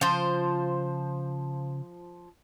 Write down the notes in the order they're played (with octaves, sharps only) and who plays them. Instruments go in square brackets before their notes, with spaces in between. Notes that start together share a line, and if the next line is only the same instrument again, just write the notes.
[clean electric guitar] C#3 F5 [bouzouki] F3 C5